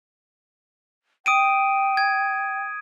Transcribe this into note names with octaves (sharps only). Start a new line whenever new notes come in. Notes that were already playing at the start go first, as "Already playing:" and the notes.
G5 D#6 D7 D#7
G#6